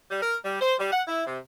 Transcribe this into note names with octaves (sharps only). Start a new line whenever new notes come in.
G3
A#4
G3
C5
G3
F#5
E4
C3